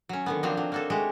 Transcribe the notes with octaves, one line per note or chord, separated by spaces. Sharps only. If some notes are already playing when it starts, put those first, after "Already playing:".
F#3 C#4
D3 D#3 B3
F3 F#3 A#3 C4 D4 D#4
F#3
A#3 F#4 A4
G#3 A3 F#4 G4